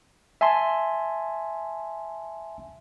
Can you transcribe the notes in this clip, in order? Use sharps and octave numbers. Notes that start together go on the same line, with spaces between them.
E5 G#5 A5 C6